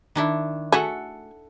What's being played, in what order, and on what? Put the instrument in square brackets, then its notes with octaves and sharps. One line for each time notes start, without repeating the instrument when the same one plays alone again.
[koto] D#3 D4 E4
[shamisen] A3 F#4 G#4 [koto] A4 E5 F#5